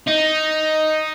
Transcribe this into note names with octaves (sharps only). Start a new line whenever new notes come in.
D#4